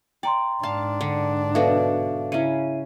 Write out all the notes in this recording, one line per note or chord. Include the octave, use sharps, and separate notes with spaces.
D5 G5 A#5 C6
G#2 D4 F5 A5
D3
B2 F#4 A4 E5 F5
C#3 C#4 E4 E5 D#7